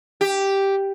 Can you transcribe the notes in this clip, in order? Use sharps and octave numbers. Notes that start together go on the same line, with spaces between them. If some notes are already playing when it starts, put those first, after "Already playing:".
G4